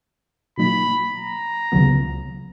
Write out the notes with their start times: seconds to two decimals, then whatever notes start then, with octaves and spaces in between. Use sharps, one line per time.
0.58 B2 F#3 A#3 D#4 B5
1.15 A#5
1.72 C#2 C#3 F#3 B3